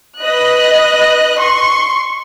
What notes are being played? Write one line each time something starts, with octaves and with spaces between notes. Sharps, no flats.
B4 D#5 F#6
C6 C#6